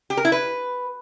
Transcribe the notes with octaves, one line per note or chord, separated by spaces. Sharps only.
G4
A#4
E4
B4